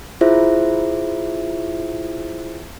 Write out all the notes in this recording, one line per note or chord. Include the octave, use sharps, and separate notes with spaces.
E4 F4 G#4 C5 E5